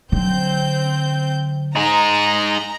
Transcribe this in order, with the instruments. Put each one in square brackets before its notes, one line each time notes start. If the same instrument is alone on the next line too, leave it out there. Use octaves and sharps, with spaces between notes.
[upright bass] D3 F#3 [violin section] C4 G6
[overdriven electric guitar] D#4 G#4 [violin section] A#5